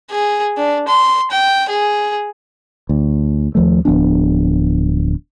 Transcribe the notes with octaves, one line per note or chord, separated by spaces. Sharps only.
G#4
D4
C6
G5
G#4
D2
D#2 F3 A3
D1 F3 B3 D4